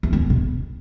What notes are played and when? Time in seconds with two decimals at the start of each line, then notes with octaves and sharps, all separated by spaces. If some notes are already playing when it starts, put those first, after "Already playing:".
0.03 E2
0.13 G2
0.30 B2